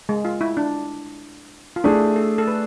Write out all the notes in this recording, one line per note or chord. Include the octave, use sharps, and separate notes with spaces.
G#3
F4
E4
D4
F4
A3 D4 E4 G#4
A4
A4
B4